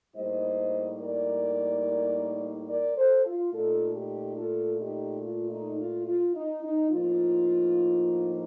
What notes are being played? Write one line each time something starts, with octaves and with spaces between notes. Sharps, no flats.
A2 G3 A#3 D#4 C5 D#5
A#4 D5
A#4 D5
A4 C5
F4
A#2 A3 D#4 F4 A4
D#4 G4
F4 A4
D#4 G4
F4
D#4
F4
F4
D#4
D#4
A2 F3 A#3 D#4 F4